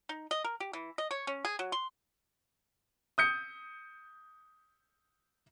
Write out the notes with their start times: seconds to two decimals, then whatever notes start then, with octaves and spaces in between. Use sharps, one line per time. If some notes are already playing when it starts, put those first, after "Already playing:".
0.09 D#4
0.31 D#5
0.44 A#4
0.60 G4
0.73 E3
0.98 D#5
1.11 C#5
1.27 C#4
1.45 G#4
1.59 F#3
1.72 C6
3.18 D#6 G6 C#7